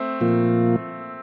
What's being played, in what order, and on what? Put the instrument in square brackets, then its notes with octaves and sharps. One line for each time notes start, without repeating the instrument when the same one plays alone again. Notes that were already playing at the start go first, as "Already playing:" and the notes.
Already playing: [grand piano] A3 C4
[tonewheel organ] A#2 F3 A#3 F4